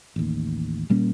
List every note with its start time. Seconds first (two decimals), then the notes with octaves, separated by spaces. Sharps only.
0.16 A1 D#2
0.90 A#2 G3 A#3 C#4